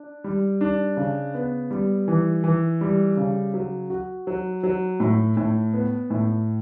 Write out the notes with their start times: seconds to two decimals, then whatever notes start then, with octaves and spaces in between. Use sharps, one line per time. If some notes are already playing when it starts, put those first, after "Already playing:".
Already playing: D4
0.24 G3
0.61 D4
0.97 C#3
1.34 B3
1.71 G3
2.08 E3
2.44 E3
2.81 G3
3.17 C#3
3.54 F#3
3.90 F#4
4.27 F#3
4.63 F#3
5.00 A2
5.37 A2
5.73 B3
6.10 A2